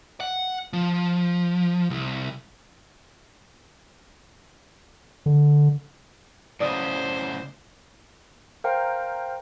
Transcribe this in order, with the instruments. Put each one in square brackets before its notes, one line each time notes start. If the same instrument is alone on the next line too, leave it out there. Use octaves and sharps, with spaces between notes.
[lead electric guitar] F#5
F3
C2
[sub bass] D3
[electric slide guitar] A2 C#3 F#3 [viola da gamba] C5 [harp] D5 D#6
[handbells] A#4 C5 F5 G5 A#5